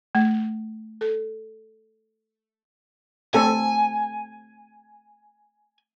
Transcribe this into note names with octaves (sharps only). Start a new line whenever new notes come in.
A3
A4
A3 C4 A4 G#5